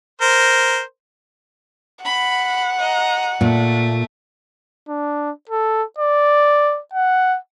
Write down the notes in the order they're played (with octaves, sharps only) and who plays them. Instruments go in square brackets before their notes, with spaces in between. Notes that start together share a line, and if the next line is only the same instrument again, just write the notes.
[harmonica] A#4 C5
[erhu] F#5 [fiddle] B5
[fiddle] D#5 A#5
[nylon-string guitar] A#2 [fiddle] A3
[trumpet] D4
A4
D5
F#5